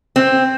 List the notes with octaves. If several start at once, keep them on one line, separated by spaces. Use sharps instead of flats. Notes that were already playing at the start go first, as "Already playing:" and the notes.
C4